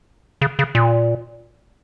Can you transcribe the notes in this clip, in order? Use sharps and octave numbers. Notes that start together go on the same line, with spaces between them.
C#3
C#3
A#2